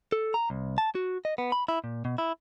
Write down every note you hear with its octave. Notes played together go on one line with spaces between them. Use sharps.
A4
A#5
C2
A5
F#4
D#5
B3
B5
E4
A#2
B2
E4